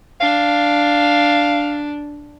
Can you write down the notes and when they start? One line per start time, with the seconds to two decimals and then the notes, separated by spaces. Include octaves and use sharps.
0.21 D4 F5